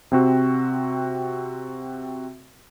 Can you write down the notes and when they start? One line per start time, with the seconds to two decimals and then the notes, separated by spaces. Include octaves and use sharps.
0.12 C3 C4 F#4